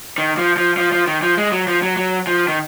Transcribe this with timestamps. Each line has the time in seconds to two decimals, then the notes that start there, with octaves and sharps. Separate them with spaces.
0.18 D#3
0.38 F3
0.57 F3
0.77 F3
0.92 F3
1.07 D#3
1.23 F3
1.37 G#3
1.52 F#3
1.67 F3
1.82 F#3
1.97 F#3
2.27 F3
2.48 D#3